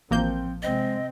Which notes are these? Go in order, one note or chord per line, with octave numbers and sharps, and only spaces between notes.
A1 F3 A#3 C4 G6
C3 G#3 C4 D#5